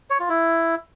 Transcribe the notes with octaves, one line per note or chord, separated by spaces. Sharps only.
C#5
F4
E4